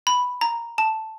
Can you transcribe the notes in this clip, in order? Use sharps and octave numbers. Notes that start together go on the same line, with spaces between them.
B5
A#5
A5